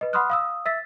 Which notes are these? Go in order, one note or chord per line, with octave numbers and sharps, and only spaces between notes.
B4 D#5
F#5 B5 C6 D#6 F6 F#6
F5 D#6 E6
E5 E6 A6 B6